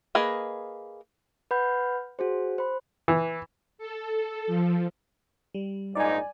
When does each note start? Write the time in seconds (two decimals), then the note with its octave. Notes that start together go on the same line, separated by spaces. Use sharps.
0.15 A#3 G#4 B4 D#5
1.51 B4 F#5 B5 G6
2.19 F#4 G#4 C5
2.58 C5 B5
3.08 E3
3.78 A4
4.47 F3
5.54 G3
5.95 A#1 G#2 D#4 D5 G#5